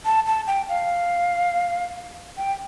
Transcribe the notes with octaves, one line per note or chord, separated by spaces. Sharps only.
A5
A5
G5
F5
G5